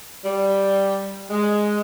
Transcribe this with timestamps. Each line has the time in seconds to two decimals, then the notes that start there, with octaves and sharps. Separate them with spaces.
0.25 G3
1.30 G#3